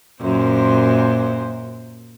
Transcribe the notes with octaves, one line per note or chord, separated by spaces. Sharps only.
F#2 A#2 C5